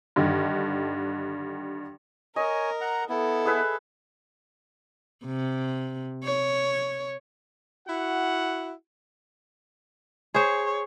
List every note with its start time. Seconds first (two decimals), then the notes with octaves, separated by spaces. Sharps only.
0.16 G2 D3 D#3
2.36 A#4 C#5 D#5 G#5
2.81 F#5 A#5
3.09 B3 E4 A4
3.45 G#4 B4 E5
5.25 C3
6.24 C#5
7.88 E4 F#4 F#5
10.34 G#4 C5 C#5